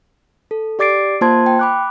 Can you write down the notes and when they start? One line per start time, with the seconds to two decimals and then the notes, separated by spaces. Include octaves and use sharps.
0.51 A4
0.79 G4 D5 D6 A6 C7 D7
1.21 A#3 F4 C5 A5 C6 G#6
1.46 G5
1.59 B5 D6 F#6